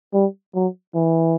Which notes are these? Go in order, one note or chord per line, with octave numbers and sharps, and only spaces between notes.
G3
F#3
E3